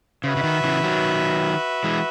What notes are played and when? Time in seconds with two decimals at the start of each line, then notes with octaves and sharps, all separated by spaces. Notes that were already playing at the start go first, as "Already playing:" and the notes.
0.23 C#3 F#4 B4 E5
0.37 C#3
0.43 D#3
0.64 C#3 E3
0.83 D#3 F#3
1.84 E3 G#3